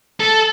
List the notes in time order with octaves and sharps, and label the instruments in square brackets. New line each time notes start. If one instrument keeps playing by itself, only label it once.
[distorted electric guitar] A4